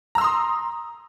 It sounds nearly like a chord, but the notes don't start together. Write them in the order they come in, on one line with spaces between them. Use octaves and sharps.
A#5 E6 C6 D#6